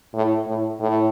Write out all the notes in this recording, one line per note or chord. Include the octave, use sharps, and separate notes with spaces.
A2
A2
A2